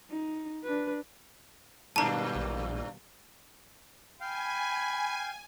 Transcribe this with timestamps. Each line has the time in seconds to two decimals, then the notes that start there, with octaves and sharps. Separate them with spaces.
0.10 D#4
0.63 D4 B4
1.96 G2 B2 D#3 G3 A#3 D4 A5 A#5
2.36 A#1
4.21 F5 G5 G#5 B5